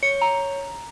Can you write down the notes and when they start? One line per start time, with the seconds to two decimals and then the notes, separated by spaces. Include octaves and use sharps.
0.03 C#5 C#7
0.21 A#5